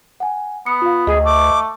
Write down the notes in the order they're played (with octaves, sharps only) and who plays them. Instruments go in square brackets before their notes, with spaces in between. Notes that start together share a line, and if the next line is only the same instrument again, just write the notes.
[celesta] F#5 G#5
[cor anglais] B3 [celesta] D#6 C#7
[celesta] F4 F5
[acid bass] D2 [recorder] G#4 [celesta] D#5
[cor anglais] A3 [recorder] D6